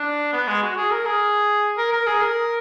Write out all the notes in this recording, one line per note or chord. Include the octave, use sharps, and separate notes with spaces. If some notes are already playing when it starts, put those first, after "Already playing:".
Already playing: D4
B3
G#3
F#4
G#4
A#4
G#4
A#4
A#4
G#4
A#4